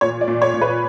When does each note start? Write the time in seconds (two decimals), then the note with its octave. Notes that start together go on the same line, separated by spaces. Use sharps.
0.01 A#2 C#5
0.21 D5
0.28 A#2
0.42 C#5
0.54 A#2
0.61 B4